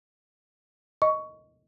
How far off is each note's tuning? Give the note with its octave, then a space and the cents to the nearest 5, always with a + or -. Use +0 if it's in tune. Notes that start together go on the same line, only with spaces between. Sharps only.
D#5 +0 C#6 +15